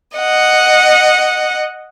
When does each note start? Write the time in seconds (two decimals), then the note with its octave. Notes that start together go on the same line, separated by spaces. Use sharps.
0.16 D#5 F#5